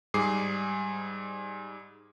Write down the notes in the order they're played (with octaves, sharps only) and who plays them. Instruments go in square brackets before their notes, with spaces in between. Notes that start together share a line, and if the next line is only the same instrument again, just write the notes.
[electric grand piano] G#2 G3 G#4 D6 C7